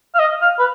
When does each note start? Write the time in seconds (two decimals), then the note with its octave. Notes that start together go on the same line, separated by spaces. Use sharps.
0.14 F5
0.19 D#5
0.42 F5
0.59 B4